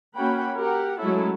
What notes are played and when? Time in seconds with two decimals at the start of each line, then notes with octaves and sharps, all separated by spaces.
0.16 A#3 C#4 F#4 F#5 G5 B5
0.58 G4 A#4 F#5
0.99 F#3 G#3 A3 C#4 E4 A4